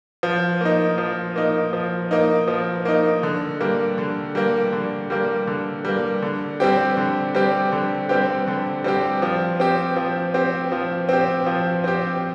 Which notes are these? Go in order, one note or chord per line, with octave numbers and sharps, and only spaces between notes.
F3
A#3 D#4
F3
A#3 D#4
F3
A#3 D#4
F3
A#3 D#4
D3
G3 A#3
D3
G3 A#3
D3
G3 A#3
D3
G3 A#3
D3
G3 C4 G4
D3
G3 C4 G4
D3
G3 C4 G4
D3
G3 C4 G4
F3
C4 G4
F3
C4 G4
F3
C4 G4
F3
C4 G4